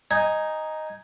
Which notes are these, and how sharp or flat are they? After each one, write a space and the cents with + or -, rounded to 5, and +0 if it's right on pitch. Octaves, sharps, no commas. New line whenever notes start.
D#4 +0 G#5 +0